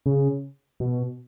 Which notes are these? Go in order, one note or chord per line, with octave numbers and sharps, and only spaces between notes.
C#3
B2